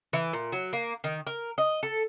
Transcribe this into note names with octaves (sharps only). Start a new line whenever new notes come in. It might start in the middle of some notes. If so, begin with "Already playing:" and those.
E3
A#2
F#3
A#3
D#3
A#4
D#5
A4